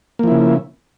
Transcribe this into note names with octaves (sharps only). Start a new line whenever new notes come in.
C#3 F3 A#3 E4